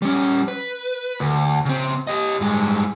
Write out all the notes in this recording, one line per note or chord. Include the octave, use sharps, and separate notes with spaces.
G3 C#4
B4
D2
C#3 C4
G4 D#5
G2 G#3